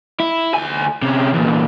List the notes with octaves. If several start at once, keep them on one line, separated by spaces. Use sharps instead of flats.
E4
D2 G#5
C3 C#4
E2 A#2